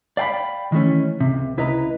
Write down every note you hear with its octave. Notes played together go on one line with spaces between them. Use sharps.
D5 F5 G5 A5 B5
D#3 E3 A3 C#4
C#2 C3
C#2 E4 B4 D#5 A#5